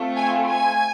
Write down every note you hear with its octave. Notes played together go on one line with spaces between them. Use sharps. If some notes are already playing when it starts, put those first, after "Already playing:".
Already playing: A3 C4 F4
G#5
G#5